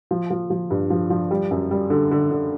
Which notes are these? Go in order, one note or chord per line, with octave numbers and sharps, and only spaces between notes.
F3
F3
F3
G2
F3
F3
G3
F#2
G3
D3
D3
D3